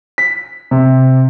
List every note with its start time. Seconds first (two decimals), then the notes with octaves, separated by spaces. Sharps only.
0.18 B6
0.71 C3